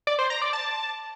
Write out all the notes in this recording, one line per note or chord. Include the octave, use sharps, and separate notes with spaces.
D5
C5
A#5
D5
A5